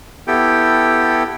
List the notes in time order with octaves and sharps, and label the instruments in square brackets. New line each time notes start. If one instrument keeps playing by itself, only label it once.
[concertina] B3 E4 G4 A4 G5